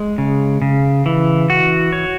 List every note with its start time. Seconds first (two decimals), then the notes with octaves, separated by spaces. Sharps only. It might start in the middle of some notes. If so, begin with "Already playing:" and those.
Already playing: G#3
0.18 C#3
0.62 C#3
1.06 E3
1.50 F#4
1.93 C#5